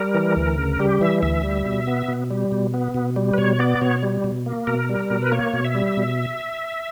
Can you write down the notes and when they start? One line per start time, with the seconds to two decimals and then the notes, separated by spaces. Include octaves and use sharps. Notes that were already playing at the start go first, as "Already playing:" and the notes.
Already playing: G3 A#4
0.15 E3
0.36 D2
0.58 C#3
0.79 G3 G4
1.01 E3 E5
1.22 D2 E5
1.44 G3
1.66 B2
1.87 B3
2.08 B2
2.31 G3
2.52 B2
2.74 B3
2.94 B2
3.16 G3
3.34 B4
3.38 B2 C#5
3.59 B3 D5
3.81 B2 C#5
4.03 G3
4.24 B2
4.46 A#3
4.67 B2 A#4
4.89 G3
5.10 B2
5.22 B4
5.32 A#3 C#5
5.54 B2
5.65 E5
5.75 G3
5.97 B2